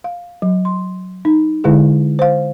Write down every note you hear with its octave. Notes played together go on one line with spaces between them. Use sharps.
F5
F#3
C6
D#4
D3 G#3 E4 G#4
C5 F5